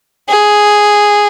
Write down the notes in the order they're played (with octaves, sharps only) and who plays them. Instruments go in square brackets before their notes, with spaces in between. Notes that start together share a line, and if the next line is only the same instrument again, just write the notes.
[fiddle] G#4